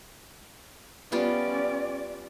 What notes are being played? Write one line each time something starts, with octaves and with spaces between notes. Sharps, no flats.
G3 B3 C#4 F4 D5